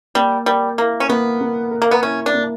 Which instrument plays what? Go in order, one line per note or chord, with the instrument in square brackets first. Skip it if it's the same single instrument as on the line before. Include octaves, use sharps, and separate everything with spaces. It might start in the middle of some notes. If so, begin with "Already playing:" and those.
[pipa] G3 [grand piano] A#3
[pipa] G3 [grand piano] A#4
[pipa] A#3 [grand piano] E4
[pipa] C#4
[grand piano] A#3 [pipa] B3
[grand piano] A#3
A#4
[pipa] A#3
B3
[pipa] C#4 [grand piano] E4
[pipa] D4
[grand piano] A#3